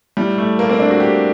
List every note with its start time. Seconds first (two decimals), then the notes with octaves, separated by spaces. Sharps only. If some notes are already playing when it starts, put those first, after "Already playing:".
0.17 A2 G3
0.38 A3
0.59 A#3
0.70 C4
0.80 D4
0.90 F#4
1.00 G4